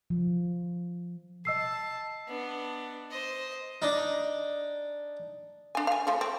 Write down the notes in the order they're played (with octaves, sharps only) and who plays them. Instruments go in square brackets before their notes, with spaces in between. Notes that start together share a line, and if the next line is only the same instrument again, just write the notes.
[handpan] F3
[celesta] D#5 E6 C7 [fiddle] A5
[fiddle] B3 D4
C5 D#5
[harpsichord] D4 D#4
[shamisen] D4 G#5
F5 G#5
F3 A3 C5
C4